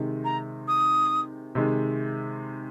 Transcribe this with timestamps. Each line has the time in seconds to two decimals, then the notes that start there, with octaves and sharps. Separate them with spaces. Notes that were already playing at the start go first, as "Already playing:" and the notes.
Already playing: C3 D#3 G#3
0.24 A#5
0.67 D#6
1.55 C3 D#3 G#3